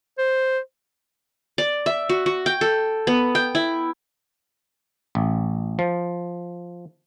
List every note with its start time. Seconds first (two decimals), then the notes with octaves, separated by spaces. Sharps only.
0.18 C5
1.58 D5
1.86 E5
2.09 F#4
2.26 F#4
2.46 G5
2.61 A4
3.07 B3
3.35 G5
3.55 E4
5.15 A1
5.79 F3